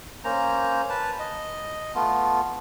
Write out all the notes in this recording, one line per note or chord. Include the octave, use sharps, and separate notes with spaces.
A#3 C#4 C5 A#5
B4 A5
D#5
A3 B3 F4